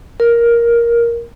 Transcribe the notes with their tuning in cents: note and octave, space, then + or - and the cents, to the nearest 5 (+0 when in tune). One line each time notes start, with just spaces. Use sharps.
A#4 +10